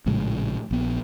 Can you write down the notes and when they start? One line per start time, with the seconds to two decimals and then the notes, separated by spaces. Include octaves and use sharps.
0.06 A#1 A2 C#3 G#3
0.71 A#1 B3